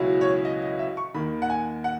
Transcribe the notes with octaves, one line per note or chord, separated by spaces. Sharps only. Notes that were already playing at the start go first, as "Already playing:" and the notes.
Already playing: C#2 B2 F#3 C#4 E4
C#5
D#5
D#5
E5
C#6
D#2 D#3 A#3 B5
F#5
G#5
F#5